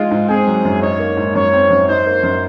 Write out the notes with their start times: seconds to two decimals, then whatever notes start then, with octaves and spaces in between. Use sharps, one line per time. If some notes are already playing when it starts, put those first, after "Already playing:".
Already playing: G#3 D#4 F4
0.11 G#2
0.28 C4 G#4
0.47 F#3
0.65 F#2
0.82 D#4 C#5
0.99 A#3
1.17 G#2
1.35 F#2 C#5
1.53 C4
1.70 F#2
1.88 D#4 C5
2.06 A#3
2.23 F#2